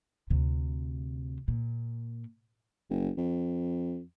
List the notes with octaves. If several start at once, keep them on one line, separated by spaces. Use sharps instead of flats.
D2 C3
A#2
F#1
F2